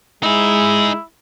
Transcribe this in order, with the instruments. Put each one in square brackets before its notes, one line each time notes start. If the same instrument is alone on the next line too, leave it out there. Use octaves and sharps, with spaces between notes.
[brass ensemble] G#3 [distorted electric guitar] D#4 G#4 [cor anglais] E4